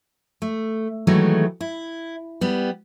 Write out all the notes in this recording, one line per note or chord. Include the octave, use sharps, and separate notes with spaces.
A3
D#3 E3 F#3 G#3 A3
E4
G3 B3